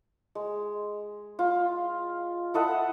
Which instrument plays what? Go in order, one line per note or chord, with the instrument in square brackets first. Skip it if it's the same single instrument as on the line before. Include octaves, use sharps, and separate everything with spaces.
[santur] G#3
F4
E4 A4 D#5 F#5